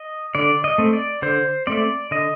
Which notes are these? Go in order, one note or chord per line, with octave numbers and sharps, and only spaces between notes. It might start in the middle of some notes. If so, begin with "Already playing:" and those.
Already playing: D#5
D3 D5
D#5
A3 C4
D5
D3 C5
A3 C4 D5
D3 D#5